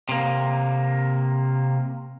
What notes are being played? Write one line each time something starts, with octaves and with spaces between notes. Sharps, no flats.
C3 A#3